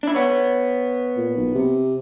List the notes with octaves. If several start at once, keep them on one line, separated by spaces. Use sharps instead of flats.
D4 E4
B3 C#5
A#2
B1
C3